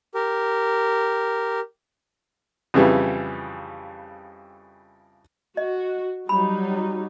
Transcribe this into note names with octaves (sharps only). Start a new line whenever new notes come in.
G4 A#4
F2 C#3 E3 G3
F#4 D#5
F#3 G3 D#4 B5